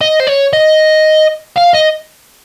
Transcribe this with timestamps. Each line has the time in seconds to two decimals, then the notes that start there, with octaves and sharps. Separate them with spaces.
0.01 D#5
0.20 C5
0.27 C#5
0.53 D#5
1.56 F5
1.74 D#5